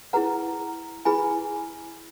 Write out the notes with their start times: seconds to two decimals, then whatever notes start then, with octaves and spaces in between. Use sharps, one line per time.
0.13 E4 G#4 B4 F#5 A#5
1.05 E4 G#4 B4 G#5 B5